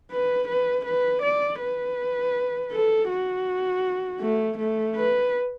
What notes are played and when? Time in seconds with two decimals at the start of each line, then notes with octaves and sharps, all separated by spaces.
0.11 B4
0.48 B4
0.85 B4
1.23 D5
1.60 B4
2.72 A4
3.09 F#4
4.21 A3
4.58 A3
4.95 B4